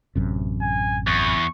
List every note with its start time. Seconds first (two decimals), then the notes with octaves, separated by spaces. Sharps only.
0.16 A1 F#2 C3
0.62 G#5
1.07 E2 C#6